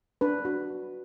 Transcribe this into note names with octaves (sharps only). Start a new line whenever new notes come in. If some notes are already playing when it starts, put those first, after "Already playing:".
D4 B4
F#4